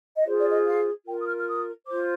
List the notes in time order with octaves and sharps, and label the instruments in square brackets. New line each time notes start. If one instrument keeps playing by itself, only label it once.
[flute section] D#5
F4 G#4 C5 D5
D5
D#5
F5
F4 A#4 G5
D#6
F6
F6
D#6
F4 C5 D6